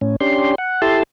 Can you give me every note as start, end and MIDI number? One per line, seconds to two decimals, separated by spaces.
0.01 0.16 45
0.01 0.16 61
0.20 0.55 61
0.20 0.55 62
0.20 0.55 67
0.20 0.55 84
0.58 0.81 78
0.82 1.03 64
0.82 1.03 67
0.82 1.03 69
0.82 1.03 81
0.82 1.03 84